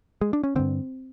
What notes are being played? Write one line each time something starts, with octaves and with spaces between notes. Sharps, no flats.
G#3
D4
C#4
G2 D3 C4